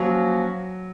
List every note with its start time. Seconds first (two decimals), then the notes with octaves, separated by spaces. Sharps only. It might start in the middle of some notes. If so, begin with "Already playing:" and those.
Already playing: F3 F#3 A#3 C#4 F#4